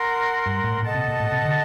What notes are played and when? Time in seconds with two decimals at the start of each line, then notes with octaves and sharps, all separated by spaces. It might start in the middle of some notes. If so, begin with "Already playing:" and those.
Already playing: A#4 F#5 C6
0.46 G2
0.64 A2
0.82 A#2 A4 D#5 F#5 A5
0.94 C3
1.08 A#2
1.20 A2
1.32 C3
1.45 D3